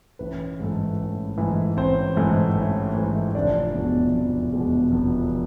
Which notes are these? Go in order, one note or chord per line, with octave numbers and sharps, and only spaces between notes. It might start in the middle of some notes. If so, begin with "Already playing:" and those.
A1 B4
G#2 E3 A3
A1
G#2 E3 A3
A1 C4 C5
G#2 E3 A3
A1
G#2 E3 A3
F1 D4 D5
E2 B2 G#3
F1
E2 B2 G#3
F1